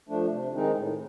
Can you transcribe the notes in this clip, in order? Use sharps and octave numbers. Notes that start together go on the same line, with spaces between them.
F3 A3 D4
C3
D#3 G#3 C4 D#4
A2